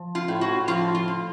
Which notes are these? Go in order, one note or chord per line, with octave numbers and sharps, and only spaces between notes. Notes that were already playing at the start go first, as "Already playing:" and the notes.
Already playing: F3
F4
A2
F#4
F3 F4
F4
F3